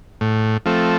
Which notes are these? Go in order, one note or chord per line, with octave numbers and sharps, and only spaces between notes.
A2
F3 A3 C4